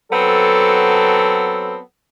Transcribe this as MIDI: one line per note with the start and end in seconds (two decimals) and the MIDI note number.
0.12 1.78 54
0.12 1.78 59
0.12 1.78 60
0.12 1.78 69